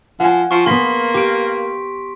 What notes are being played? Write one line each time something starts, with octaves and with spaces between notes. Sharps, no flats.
F3 F#5 G#5
F3 C#6
A#3 B3 G#4 C6 B6
G4 D6 D7